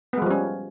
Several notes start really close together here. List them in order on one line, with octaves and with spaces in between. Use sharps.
B3 G#3 F3 G3 C#4